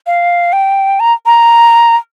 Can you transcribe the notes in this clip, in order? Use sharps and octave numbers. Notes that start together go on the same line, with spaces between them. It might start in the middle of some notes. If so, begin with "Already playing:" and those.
F5
G5
A#5
A#5